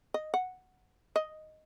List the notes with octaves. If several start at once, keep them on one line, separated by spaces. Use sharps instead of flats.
D#5
F#5
D#5